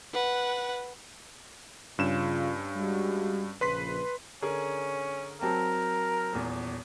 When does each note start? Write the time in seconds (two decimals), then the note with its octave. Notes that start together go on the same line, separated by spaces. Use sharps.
0.13 B4 F#5
1.99 G2 C#3 C#4 F4 E7
2.76 G3 G#3 F#4
3.61 A#1 C#3 F3 B4 C6 B6
4.42 D3 C#4 G#4 A#4
5.41 F#3 C4 A#4 A5
6.33 D#1 E2